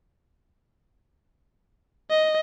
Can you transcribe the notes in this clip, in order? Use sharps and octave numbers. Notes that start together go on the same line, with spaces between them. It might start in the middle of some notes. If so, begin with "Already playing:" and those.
D#5